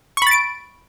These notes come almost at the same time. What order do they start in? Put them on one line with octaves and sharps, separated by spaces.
C#6 B5 A6 D7